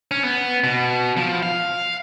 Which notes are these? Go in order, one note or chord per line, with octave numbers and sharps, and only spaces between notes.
C#4
B3
B2
F3
F5